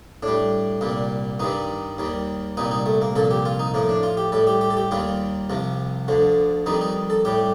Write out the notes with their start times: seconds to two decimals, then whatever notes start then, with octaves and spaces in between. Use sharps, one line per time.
0.23 A2 G3 D4
0.81 C2 A#2 G3
1.40 G2 D#3 G3 D#4
1.98 D#2 D#3 G3
2.57 C2 A#2 G3 D#4
2.71 D#4
2.86 A3
3.02 A#3
3.16 C2 A#2 F3 A4
3.31 G4
3.45 F4
3.59 D#4
3.74 A2 F3 A#3
3.89 D4
4.03 F4
4.17 G4
4.32 A2 G3 A4
4.47 G4
4.61 G4
4.70 A4
4.77 G4
4.91 D#2 D#3 G3 F4
5.50 C2 C3 F3
6.08 D2 D3 F3
6.66 F2 D#3 G3 D#4
6.81 D#4
7.10 A4
7.25 A2 G3 G4